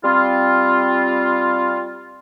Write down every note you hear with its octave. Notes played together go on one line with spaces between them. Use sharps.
G3 C4 F4